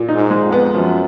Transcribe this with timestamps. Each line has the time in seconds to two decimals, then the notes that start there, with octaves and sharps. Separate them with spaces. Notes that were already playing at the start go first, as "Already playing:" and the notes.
Already playing: A#2
0.09 D#4
0.15 G#2
0.30 G#3
0.45 F2
0.52 B3
0.74 F#2 F3